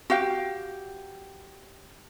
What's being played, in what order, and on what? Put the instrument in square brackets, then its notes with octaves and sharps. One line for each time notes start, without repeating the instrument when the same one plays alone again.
[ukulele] F#4 G4 F5 G5